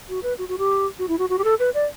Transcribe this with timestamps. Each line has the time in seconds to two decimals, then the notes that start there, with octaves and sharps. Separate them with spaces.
0.09 F#4
0.23 B4
0.38 F#4
0.49 F#4
0.58 G4
0.99 F#4
1.08 E4
1.19 F#4
1.29 F#4
1.38 G4
1.44 A4
1.59 B4
1.74 D5